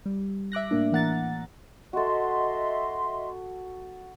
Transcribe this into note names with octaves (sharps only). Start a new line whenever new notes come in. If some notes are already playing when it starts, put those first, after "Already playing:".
G3
E5 D6 F#6 A#6
A2 A#3 D4
E3 A#3 F#5 A#5 A6
F#4 A4 D#5 E5 C6